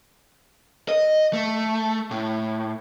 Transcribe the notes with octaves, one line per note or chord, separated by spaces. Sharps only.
D#5
A3
A2